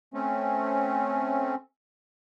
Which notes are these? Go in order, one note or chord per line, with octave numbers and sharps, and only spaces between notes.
A3 C4 C#4